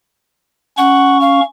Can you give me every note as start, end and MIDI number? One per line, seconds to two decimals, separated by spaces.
0.78 1.41 61
0.78 1.20 78
0.78 1.41 85
1.21 1.43 77